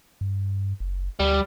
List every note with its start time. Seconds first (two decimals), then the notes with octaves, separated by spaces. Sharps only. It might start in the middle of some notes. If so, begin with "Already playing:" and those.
0.21 G2
0.80 F#1
1.20 D2 G3